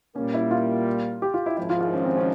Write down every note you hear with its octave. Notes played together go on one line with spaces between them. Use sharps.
A#2 G3 A#3 C#4
E4
F4
G4
F4
E4
G#1 G#2 F3 E4
F4
F4
C#4
C4
C#4